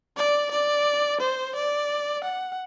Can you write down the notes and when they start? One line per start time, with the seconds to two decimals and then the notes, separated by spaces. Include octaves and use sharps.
0.17 D5
0.52 D5
1.21 C5
1.56 D5
2.24 F#5